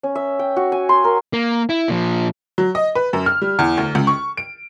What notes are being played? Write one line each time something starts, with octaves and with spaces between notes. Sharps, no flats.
C#4
E5
G5
F#4
G#5
C6
A#4
A#3
E4
A#2 F3
F#3
D#5
B4
F#2
F6
G3
E2
D2
C#2
C#6
D7